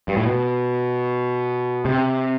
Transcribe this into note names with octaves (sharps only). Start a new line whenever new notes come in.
G2
A2
B2
C3